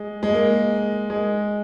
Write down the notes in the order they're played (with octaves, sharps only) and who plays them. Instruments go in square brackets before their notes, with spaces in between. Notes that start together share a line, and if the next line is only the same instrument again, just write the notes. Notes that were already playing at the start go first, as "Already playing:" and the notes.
Already playing: [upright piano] G#3
G#3
A#3
G#3